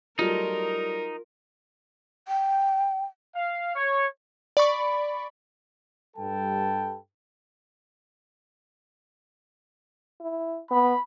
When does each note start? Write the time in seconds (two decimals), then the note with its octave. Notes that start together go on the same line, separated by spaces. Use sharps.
0.19 F#3 G3 A3 D#4 F4 A#4
2.28 G5
3.35 F5
3.75 C#5
4.57 D5 B5 C#6
6.17 G2 G3 A4 B4 G5 A5
10.20 E4
10.71 B3 B5